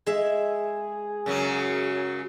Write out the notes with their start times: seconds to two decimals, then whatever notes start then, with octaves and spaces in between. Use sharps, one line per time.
0.06 G#3 G#4 E5
1.26 F#2 C#3 F#3